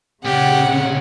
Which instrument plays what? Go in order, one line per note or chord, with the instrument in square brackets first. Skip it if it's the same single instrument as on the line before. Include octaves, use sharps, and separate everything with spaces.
[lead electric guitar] A#2 C#4 [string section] C#3 [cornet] G4 [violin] F#5